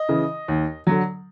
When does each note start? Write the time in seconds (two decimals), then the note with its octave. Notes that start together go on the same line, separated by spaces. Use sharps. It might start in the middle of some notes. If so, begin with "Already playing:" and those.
Already playing: D#5
0.09 C#3 E3
0.48 D#2
0.87 D3 F#3